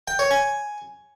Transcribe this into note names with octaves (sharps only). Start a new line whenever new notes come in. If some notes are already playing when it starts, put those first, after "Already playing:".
G5
C#5
G#5